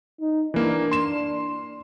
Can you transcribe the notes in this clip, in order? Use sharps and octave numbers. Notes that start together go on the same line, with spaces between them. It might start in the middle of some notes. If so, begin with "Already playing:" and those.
D#4
E3 A#3 D4
C6 E7